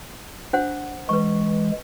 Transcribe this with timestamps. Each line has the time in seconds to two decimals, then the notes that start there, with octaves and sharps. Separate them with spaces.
0.53 D4 C5 F#5
1.09 E3 G#3 B4 C#6